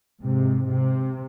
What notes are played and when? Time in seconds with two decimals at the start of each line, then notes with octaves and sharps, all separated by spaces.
0.21 G#2 C3
0.69 C3